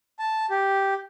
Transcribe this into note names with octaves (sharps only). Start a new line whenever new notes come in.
A5
G4